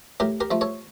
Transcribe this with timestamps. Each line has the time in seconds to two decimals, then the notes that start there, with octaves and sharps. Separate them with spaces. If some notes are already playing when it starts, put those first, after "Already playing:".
0.20 A2 G4 A#4
0.40 G4 A#4
0.51 F3 A3
0.61 A4 C#5